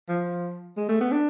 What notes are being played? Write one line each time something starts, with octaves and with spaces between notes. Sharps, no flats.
F3
G#3
A3
B3
D4